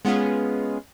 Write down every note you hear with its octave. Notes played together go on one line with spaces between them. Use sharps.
G#3 B3 C#4 F4 G#4